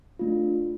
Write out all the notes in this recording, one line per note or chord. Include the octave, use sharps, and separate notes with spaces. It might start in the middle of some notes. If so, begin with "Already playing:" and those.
A3 D4 F4